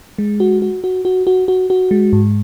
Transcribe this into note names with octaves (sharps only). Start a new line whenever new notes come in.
G#3
F#4
F#4
F#4
F#4
F#4
F#4
F#4
G#3
G#2